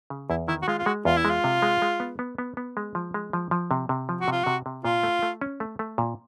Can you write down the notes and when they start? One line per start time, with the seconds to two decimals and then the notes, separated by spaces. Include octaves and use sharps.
0.10 C#3
0.30 E2 E4
0.48 D#3 E4
0.62 F#4
0.68 G#3 F4
0.79 F4
0.86 G#3 F#4
1.05 E2 F4
1.17 E4
1.25 G#3
1.30 F4
1.44 C3
1.62 G#3
1.82 G#3
2.00 B3
2.19 B3
2.38 B3
2.57 B3
2.77 G#3
2.95 F3
3.14 G#3
3.33 F3
3.51 F3
3.71 C3
3.89 C3
4.09 F3
4.21 F#4
4.28 C3 F4
4.44 C3 F#4
4.66 C3
4.85 A#2 F4
5.03 A3
5.22 A3
5.41 C#4
5.60 A3
5.79 A3
5.98 A#2